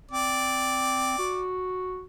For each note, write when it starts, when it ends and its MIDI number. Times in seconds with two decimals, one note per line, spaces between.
0.11 1.15 60
0.11 1.46 74
1.18 2.04 66